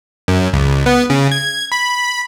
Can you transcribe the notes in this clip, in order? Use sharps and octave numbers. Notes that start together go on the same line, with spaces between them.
F#2
C#2
B3
C#3
G#6
B5